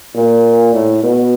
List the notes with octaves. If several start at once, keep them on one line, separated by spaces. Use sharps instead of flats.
A#2
A2
B2